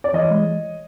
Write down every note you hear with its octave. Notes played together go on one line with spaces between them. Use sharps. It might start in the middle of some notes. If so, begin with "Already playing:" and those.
D5
E3 C#5 D#5
G#3